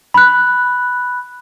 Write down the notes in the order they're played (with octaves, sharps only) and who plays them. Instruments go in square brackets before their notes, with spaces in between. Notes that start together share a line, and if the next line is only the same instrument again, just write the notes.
[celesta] B5 F#6